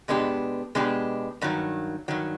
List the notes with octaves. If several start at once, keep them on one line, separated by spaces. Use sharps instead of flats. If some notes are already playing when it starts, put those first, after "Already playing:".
B2 G#3 B3 D4 G4
B2 G#3 B3 D4 G4
G2 D#3 F#3
G2 D#3 F#3